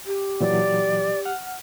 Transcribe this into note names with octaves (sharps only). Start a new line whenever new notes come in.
G4
A#2 E3 F#3 D5
F#5 F6